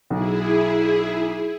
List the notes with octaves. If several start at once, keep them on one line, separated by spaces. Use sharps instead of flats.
B1 E4 G#4